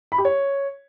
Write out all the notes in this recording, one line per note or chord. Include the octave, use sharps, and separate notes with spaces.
B5
G4
C#5